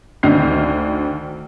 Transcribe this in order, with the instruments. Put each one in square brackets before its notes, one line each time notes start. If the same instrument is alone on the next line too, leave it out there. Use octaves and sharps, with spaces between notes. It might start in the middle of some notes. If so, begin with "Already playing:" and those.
[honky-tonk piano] D2 D#3 D4 F6 G6 C7